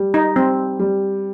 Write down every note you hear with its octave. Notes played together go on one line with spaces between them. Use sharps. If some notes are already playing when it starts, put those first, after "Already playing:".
Already playing: G3
D#4
G3 C4
G3